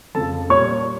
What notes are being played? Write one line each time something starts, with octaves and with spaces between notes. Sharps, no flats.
F2 C#3 F3 A4 A5
A#2 G3 C#5 C#6